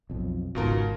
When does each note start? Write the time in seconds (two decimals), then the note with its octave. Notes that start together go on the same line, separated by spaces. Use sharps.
0.10 B1 F2
0.55 G#1 C#2 B2 D#3 F4 A#4